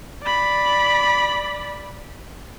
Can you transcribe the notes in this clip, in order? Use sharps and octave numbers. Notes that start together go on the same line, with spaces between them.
D5 B5